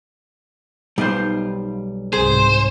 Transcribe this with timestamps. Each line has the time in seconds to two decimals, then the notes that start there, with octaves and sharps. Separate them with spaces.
0.98 B1 G3 D#4 F4 C5
2.13 C2 G#2 G#4 C5